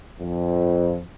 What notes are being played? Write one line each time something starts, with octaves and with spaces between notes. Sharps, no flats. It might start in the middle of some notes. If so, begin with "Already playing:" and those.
F2